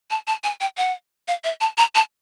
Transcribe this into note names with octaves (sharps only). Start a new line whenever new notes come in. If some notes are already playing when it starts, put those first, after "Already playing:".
A5
A5
G#5
G5
F#5
F5
E5
A5
A#5
A5